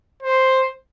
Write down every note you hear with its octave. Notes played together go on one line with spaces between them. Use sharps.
C5